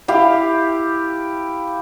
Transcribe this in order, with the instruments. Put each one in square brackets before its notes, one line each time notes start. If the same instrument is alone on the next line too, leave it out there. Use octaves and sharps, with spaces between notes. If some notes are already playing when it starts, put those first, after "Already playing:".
[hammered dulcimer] E4 G4 F5